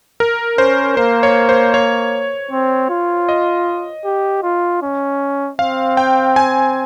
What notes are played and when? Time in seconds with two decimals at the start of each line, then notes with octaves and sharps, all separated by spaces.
0.20 A#4
0.58 C#4 C5
0.97 A#3 C5
1.23 C#5
1.49 C5
1.74 C#5
2.51 C4
2.90 F4
3.29 D#5
4.05 G4
4.43 F4
4.82 C#4
5.59 C4 F5
5.97 G5
6.36 G#5